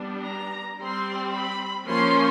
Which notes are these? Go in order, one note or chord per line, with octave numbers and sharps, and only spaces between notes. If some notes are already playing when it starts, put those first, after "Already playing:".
Already playing: G3 B3 D4
A#5
G3 C4 C6
B5
F3 A#3 C#4 C6